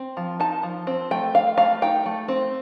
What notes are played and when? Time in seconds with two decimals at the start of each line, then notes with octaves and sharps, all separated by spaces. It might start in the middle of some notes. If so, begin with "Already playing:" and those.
Already playing: C4
0.17 F3
0.40 D#4 A5
0.63 F3
0.87 C4
1.11 A3 G5
1.34 C4 F5
1.57 A3 F5
1.82 D#4 G5
2.06 A3
2.28 C4